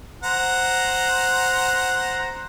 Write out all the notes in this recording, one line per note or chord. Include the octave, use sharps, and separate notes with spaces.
C5 F#5 A#5